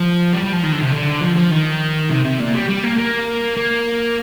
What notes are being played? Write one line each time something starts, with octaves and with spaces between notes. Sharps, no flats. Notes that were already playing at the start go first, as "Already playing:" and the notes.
Already playing: F3
G3
G3
F3
D#3
D3
C3
D3
F3
F3
D#3
C3
C3
A#2
G3
G3
A#3
A#3
A#3